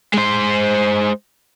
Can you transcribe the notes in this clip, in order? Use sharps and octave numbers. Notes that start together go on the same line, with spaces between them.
G#3 C5